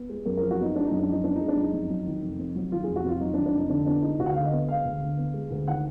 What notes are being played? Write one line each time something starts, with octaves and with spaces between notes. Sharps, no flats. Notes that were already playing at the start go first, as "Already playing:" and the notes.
Already playing: B3
G#3
F#2 A#4
F3 A#4
F#4
B3 D#4
G#3 D4
F#2 D#4
D4
F3 D#4
B3 D4
G#3 D#4
D4
F#2 D#4
F2
F#3
D#3
F1
F2
F#3
D#3 F4
F1 G#4
F#4
F2 F4
F#3 D#4
D4
D#3
D4
F1 D#4
D3 D4
B3 D4
G#3 D#4
D2 F#4
F#5
D3 F5
D#5
B3
G#3 F5
D2
D3
B3
G#3
D2
D#3 F#5